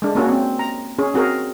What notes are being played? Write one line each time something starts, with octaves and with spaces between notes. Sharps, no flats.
G#3 D4
A#3 C#4 F#4
C4
A#5
C#4 G#4
C4 F#4 G#4 A#4